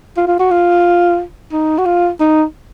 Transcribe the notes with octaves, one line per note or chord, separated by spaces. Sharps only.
F4
F4
F#4
F4
D#4
F#4
F4
D#4